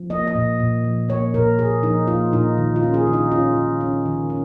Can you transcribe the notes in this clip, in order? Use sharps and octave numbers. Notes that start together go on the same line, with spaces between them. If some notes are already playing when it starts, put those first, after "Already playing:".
Already playing: F3
A#3 D#5
D#5
A#2
A#2
F3
A#3 C#5
A#2 A#4
A#2 G#4
F3 D#4
A#3 F4
A#2 D#4
D#3
F4
C#4
G#4
D#3
D#4
C#4 F4
D#3
C#4
D#3
C#4